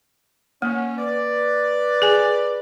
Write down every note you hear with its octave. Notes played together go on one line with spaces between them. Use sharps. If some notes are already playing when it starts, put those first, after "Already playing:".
A#3 C#4
B4 D5
G#4 G#5